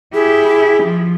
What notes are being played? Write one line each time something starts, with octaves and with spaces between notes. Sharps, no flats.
E4 G4 G#4
F3